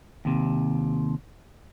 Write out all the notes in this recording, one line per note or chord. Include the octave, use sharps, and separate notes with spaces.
D#2 C3